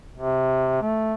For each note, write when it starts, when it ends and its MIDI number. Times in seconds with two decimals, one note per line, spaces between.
0.16 0.82 48
0.82 1.14 57